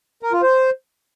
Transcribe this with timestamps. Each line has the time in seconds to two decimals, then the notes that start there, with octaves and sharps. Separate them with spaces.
0.23 A#4
0.32 F4
0.42 C5